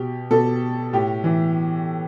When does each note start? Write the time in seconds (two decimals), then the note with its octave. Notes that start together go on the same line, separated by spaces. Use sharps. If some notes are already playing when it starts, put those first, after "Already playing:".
Already playing: B2 G4
0.31 B2 A4
0.93 A2 G4
1.24 E3